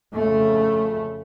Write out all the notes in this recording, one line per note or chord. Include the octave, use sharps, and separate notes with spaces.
F2 C#3 A3